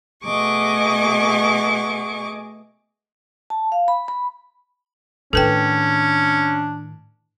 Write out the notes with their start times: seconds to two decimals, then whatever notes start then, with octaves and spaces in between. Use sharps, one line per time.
0.23 B2 A3 G#4 D#5 C#6 D6
3.50 A5
3.72 F5
3.88 B5
4.08 B5
5.33 A2 D#3 C#4 D4 A4 B4 G5